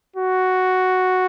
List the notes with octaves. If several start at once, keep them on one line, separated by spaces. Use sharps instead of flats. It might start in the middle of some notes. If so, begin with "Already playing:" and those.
F#4